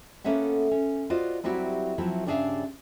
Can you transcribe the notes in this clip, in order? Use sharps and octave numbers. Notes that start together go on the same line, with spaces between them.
A#3 B3 C#4 A4 E5 F#5
C#4
F4 F#4 C5 D5 D#5
F#3 G3 C4 E4 F#4 G4
F3 F#3 C4 E4
G2 C#3 D4 G#4 E5 F5